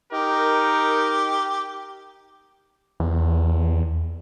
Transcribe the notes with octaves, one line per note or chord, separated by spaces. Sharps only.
D#4 G4 A#4
E2